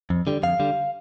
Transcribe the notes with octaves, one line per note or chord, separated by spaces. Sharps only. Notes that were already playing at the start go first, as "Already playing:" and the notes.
F2
D3 G3
F2 F5
D3 G3